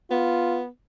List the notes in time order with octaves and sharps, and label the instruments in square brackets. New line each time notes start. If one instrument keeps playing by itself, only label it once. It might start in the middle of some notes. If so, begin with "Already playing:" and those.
[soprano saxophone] B3 [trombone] F4